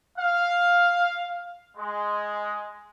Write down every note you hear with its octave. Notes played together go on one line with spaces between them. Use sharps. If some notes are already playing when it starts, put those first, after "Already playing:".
F5
G#3